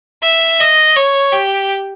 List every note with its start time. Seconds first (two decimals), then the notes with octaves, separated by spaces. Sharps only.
0.23 E5
0.60 D#5
0.96 C#5
1.32 G4